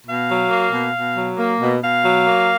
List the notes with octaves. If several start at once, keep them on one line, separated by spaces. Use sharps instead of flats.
B2 F5
F#3
A#3
B2
B2
F#3
A#3
B2
B2 F5
F#3
A#3